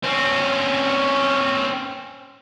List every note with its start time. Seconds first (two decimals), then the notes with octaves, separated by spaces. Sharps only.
0.03 C4 C#4